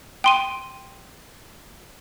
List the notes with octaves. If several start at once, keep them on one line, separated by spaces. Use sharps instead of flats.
G5 C6 D#7